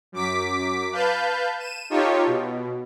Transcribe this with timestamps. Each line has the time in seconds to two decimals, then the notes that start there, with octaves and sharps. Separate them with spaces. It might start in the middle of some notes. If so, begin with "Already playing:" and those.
0.12 F#2 D6 B6
0.92 B4 F5 A5 G6
1.59 D#7 E7
1.90 D#4 F4 G4 A4 C#5
2.26 B2